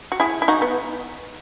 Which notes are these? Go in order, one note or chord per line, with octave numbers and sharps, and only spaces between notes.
F#4
E4 G#4
E4
D#4 F#4
B3